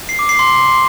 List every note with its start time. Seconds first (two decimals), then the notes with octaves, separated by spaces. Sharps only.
0.09 C7
0.19 D6
0.29 C7
0.39 C6